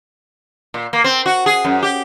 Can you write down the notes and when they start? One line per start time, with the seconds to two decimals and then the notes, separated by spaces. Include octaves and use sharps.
0.74 A#2
0.93 A#3
1.04 C4
1.26 F#4
1.46 G#4
1.65 F#2
1.83 G4